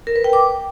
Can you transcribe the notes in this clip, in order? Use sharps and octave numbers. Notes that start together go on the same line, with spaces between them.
A#4
B4
G5
D6